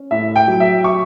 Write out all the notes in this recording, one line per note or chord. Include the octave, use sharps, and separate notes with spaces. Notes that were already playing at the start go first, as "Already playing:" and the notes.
Already playing: C#4
A2 E5
G5
F#3
E5
C#6